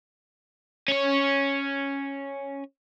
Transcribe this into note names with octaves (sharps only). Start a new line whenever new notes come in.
C#4 C#5